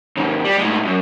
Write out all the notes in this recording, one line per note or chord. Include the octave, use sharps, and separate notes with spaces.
D#2 G#2
G3
A2 G#3
F#2